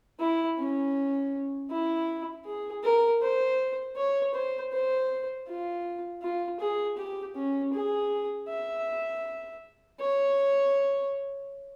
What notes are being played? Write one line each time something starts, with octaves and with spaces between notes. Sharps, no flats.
E4
C#4
E4
G#4
A#4
C5
C#5
C5
C5
F4
F4
G#4
G4
C#4
G#4
E5
C#5